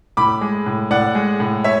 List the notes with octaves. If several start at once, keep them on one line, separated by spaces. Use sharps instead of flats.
A2 B5 D6
G#3
A2
A2 D5 F#5
G#3
A2
C#5 E5